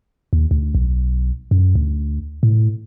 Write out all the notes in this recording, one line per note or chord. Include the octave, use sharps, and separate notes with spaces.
D#2
D2
B1
F#2
D2
A2